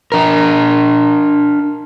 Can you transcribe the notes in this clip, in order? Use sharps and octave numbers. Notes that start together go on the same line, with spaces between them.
D4 A#4